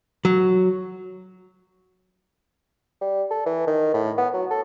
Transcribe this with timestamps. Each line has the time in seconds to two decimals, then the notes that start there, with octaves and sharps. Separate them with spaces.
0.25 F#3
3.01 G3
3.31 A4
3.46 E3
3.67 D#3
3.94 A2
4.18 B3
4.34 F#3
4.51 A4